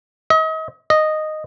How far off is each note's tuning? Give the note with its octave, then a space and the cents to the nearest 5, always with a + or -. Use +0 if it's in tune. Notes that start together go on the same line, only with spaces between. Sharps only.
D#5 +35
D#5 -10